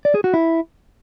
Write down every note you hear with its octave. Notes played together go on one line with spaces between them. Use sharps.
D5
G#4
F#4
E4